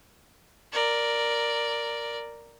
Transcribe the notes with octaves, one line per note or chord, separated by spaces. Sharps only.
A#4 D5